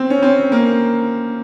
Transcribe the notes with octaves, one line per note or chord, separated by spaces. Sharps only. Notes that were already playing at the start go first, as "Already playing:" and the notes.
Already playing: C4
C#4
C4
A#3